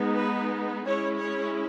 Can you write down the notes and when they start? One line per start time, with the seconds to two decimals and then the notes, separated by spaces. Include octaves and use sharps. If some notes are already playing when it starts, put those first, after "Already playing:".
Already playing: G#3 B3 D#4
0.17 B4
0.84 G#3 C#4 E4 C#5
1.18 C#5